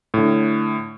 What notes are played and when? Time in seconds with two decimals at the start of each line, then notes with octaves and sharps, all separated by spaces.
0.14 A2 D3